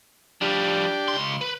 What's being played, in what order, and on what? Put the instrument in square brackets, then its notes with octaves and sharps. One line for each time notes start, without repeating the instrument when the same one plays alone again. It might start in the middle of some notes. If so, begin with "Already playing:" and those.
[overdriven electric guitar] F3 G3 [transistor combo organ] D4 G4
[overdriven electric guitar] C#2 C6
B4